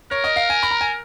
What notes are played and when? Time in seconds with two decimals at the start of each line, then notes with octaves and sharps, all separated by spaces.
0.11 A#4 C#5
0.24 D#5
0.36 F5
0.50 G#5
0.63 B5
0.71 A#5
0.81 G#5